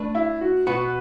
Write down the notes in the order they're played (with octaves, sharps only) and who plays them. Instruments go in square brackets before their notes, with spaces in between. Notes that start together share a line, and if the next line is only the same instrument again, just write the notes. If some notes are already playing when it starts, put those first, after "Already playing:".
Already playing: [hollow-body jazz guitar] A3 D4 B4
[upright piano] E4
F#4
[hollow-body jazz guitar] B2 B3 F#4 [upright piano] B4